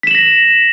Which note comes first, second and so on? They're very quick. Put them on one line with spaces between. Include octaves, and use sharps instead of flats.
B6 E7 F#7 A#6